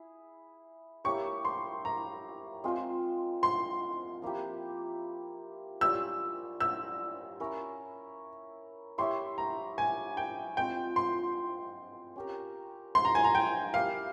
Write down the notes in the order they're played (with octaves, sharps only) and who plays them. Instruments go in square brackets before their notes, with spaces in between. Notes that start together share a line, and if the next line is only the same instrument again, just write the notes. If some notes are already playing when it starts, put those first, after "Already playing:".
Already playing: [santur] E4 G#4
[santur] A#3 E4 G4 C#5 [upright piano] C#6
[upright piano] C6
A#5
[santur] G#3 C4 F4
[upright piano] C6
[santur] F3 A#3 E4 G4
[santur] G3 C#4 F4 [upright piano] E6
[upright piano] E6
[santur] C#4 E4 A#4 C#5
[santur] E4 G4 C#5 E5 [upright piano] C6
[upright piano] A#5
G#5
G5
[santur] G#3 C4 F4 [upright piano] G5
[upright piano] C6
[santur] C#4 G4 A#4
[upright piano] C6
A#5
G#5
A#5
G5
[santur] A#3 E4 G4 A#4 [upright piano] F5